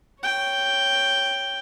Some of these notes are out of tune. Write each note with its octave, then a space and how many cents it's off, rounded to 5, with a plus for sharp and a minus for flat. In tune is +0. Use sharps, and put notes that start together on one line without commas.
C#5 +0 G5 +0